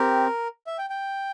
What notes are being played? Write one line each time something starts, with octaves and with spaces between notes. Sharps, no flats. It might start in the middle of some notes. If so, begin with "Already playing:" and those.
Already playing: C4 G4 A#4
E5
G5
G5